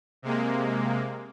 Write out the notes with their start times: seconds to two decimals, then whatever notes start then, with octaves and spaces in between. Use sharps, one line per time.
0.22 C3 G#3 A#3